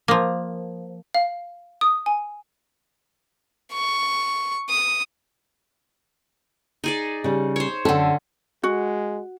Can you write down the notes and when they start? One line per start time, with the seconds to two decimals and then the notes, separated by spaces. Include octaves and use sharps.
0.08 F3 A#3
1.15 F5
1.81 D#6
2.06 G#5
3.73 C#6
4.69 D#6
6.84 D#4 G#4 D5
7.24 C#3 G3
7.56 C5 C#5
7.85 F#2 D3 C#4 A4 G5
8.64 G#3 F#4